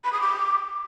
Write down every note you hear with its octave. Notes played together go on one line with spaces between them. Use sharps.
B5
D#6
D6